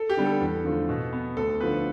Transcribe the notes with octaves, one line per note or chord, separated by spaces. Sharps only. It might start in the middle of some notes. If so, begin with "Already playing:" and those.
Already playing: A4
G4
D3 G3 B3
A4
E2
D3 F3 A3
B2
B3
D2 A4
D3 F3 B3 B4